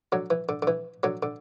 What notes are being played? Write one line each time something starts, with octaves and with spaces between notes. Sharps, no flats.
D3 F#3
E3
D3
D3
E3
D3 F#3
D3